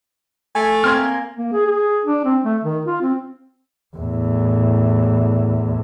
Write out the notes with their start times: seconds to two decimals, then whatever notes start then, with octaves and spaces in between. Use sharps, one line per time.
0.55 A3 G#5
0.84 A#3 C4 C6 F6 G#6
1.36 A#3
1.53 G#4
1.66 G#4
2.05 D4
2.24 C4
2.44 A3
2.63 D#3
2.85 F4
3.02 C4
3.97 E2 A2